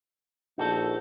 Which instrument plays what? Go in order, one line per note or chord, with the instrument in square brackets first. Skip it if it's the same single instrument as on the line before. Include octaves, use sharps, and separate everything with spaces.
[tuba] A#1 [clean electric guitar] D#4 F#4 A4